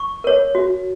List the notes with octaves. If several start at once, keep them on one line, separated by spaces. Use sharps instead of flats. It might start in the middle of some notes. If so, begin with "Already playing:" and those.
Already playing: C#6
A#4 C#5
F#4